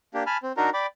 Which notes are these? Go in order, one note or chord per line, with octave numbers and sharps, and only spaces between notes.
A#3 D4 G4
G#5 A5 B5 F6
C4
D4 D#4 F#4 A#4 A#5
D5 G5 B5 D6